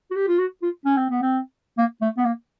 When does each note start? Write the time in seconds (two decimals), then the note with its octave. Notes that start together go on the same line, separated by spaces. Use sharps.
0.11 F#4
0.16 G4
0.28 F4
0.39 F#4
0.62 F4
0.86 C#4
0.97 C4
1.10 B3
1.22 C4
1.78 A#3
2.02 A3
2.17 B3
2.25 A#3